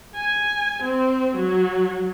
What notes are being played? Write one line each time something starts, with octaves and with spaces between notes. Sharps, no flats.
G#5
C4
F#3